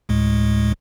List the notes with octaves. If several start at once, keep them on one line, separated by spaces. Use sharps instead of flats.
D2 A2 G#3